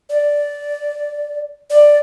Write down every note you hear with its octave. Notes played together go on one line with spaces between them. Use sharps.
D5
D5